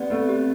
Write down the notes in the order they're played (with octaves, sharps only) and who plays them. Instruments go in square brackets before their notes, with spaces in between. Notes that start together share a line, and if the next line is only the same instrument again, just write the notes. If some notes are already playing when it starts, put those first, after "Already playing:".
Already playing: [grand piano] B3 [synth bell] C4 G4 D5
[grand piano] A3 [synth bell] C4
[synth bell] G4